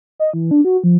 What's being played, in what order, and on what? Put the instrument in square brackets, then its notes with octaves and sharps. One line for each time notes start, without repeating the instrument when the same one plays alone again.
[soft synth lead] D#5
E3
D4
F#4
F3